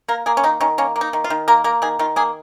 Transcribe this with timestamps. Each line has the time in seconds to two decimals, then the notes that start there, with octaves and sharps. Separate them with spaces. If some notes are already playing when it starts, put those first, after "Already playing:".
0.08 A#3 A#4
0.26 A#3 G#4
0.37 C#4
0.44 D#3 D#4
0.61 D#3 C#4
0.78 A#3 C#4
0.96 A#3
1.01 D#4
1.13 D#3
1.24 F4
1.30 D#3
1.48 A#3 A#4
1.64 A#3 A#4
1.82 D#3 G#4
1.99 D#3 F4
2.16 A#3 G#4